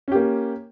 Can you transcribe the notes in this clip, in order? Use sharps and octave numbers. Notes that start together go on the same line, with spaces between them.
A#3 C#4 G4